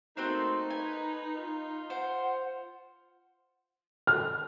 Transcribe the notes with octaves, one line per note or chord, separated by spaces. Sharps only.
A3 A#3 C4 D#4 F#4 C5
B4 G#5
F4
C5 F#5
F6